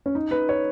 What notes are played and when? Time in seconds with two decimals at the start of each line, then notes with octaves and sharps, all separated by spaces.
0.06 C#4
0.15 D#4
0.31 B4
0.49 C#5